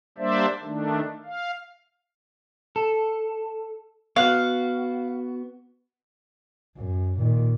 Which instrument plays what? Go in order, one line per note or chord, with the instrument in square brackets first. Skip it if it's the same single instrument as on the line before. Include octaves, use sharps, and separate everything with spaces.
[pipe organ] G3 A#3 D4 C5 D5 E5
D#3 A3 D4
F5
[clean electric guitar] A4
[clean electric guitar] B3 F#4 [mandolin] F5 F#6
[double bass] F#2
A#2 D#3